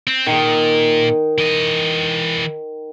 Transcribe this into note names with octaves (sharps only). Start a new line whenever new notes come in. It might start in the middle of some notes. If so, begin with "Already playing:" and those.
C4
A#2 D#3
E3 D#5